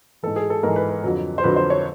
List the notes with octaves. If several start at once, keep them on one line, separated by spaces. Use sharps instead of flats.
G#2 E3 A4
G#4
A4
G#2 E3 A#4
B4
B4
F2 D3 F#3
C5
F2 D3 F#3 B4
C5
C#5